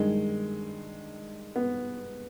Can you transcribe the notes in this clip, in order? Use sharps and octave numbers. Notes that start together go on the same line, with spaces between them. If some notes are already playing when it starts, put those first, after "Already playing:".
Already playing: G2 D#3 G#3
B3